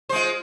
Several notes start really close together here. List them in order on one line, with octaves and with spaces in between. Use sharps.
C5 G#3 F4